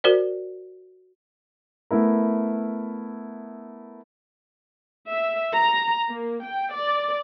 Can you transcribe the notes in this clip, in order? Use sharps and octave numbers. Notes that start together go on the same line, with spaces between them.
F#4 A#4 C5 D5
A3 B3 E4 A#4
E5
A#5
A#3
G5
D5